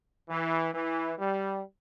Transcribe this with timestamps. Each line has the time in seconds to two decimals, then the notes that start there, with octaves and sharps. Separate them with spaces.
0.28 E3
0.72 E3
1.19 G3